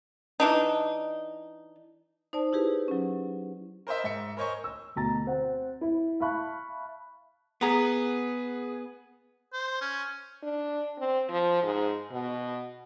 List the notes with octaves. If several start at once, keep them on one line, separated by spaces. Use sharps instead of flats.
E3 D4 D#4
D#4 C5 D5 A5
E4 G4 G#4 B4
F#3 C#4
A#4 C5 D#5 E5
G#2 E5 C#7
A#4 C5 C#5 D#5 G#5 C#6
E6
D2 B2 A#5 A6
C4 F#5
E4
E5 F5 A5 B5 C#6 F#6
B3 G#4 F#5 A#5
C5
C#4
D4
C4
F3
G#2
B2